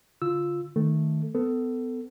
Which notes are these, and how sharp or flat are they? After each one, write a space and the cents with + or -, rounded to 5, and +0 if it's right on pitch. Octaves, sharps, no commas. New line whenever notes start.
D3 -25 F4 +0 E6 +0
D#3 +0 A3 +0 A4 +0
B3 +30 A4 +15